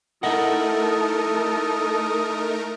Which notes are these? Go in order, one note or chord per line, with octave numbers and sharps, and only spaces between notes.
A3 D#4 E4 A4 A#4 D#5 F#5 D#6